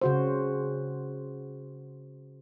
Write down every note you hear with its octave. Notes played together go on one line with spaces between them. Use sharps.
C#3 F#4 C5